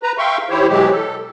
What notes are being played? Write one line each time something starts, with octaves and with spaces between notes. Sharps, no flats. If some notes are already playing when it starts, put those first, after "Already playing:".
B4 A#5
E5 F5 G5 C6 C#6
D#3 E4 G4 C5 C#5
B2 E3 F#3 G#3 G4
A4